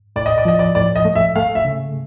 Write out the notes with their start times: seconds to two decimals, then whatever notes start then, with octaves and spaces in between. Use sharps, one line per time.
0.16 A2 D5
0.26 D#5
0.38 D5
0.45 F3 D#5
0.59 D5
0.75 A2 D5
0.96 D#5
1.05 A3
1.15 E5
1.36 A3 F5
1.55 E5
1.65 C#3